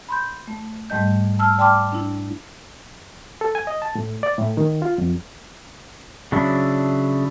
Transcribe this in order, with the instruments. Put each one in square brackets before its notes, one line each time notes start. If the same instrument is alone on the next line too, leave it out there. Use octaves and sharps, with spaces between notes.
[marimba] B5 C6 G6
A3
G#2 G3 A3 D#5 G6
A5 E6 F6
D5 G5 A5 C6 D6 F6
D4 E4
[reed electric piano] A4
G#5
D#5
A5
A2
D5
A2
D#3
F4
F2
[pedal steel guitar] C#3 F#3 D4 E4